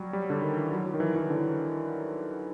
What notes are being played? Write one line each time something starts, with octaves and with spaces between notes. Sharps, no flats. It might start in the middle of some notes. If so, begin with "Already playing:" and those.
Already playing: F#3 G3
G3
D3
D#3
E3
F#3
F#3
D#3
E3
E3
D3